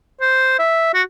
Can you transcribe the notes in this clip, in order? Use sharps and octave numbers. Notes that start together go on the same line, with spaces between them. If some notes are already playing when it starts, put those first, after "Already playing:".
C5
E5
F#4